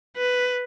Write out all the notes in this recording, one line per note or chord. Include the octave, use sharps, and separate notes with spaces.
B4